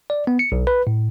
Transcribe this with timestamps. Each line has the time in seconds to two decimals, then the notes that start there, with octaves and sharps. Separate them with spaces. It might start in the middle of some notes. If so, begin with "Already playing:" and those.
0.10 D5
0.27 B3
0.39 C#7
0.52 B1
0.67 B4
0.87 A2